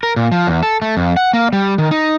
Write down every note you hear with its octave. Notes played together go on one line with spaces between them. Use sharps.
A#4
A#2
F3
E2
A4
A3
F2
F#5
A#3
G3
D#3
D#4